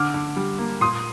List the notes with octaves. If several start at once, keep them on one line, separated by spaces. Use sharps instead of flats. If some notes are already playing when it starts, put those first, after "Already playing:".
Already playing: D3 D6 F6
D3
G3
A#3
A#2 C6 D#6